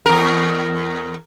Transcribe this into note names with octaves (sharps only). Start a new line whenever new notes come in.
E2 A#4